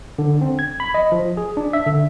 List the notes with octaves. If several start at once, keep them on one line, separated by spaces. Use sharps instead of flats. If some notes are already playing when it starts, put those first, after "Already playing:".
D3
C4
G#6
B5
D#5
F3
G#4
D4
E5
D3